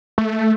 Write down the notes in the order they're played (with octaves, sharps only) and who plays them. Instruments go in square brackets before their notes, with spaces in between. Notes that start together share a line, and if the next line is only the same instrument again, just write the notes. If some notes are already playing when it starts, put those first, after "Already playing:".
[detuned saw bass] A3